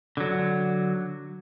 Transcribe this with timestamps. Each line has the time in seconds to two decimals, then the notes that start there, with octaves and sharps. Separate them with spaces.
0.17 D3 F#3